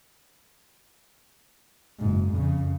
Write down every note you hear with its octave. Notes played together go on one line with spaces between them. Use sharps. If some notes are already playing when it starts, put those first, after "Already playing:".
F#1 G#2
F2 C#3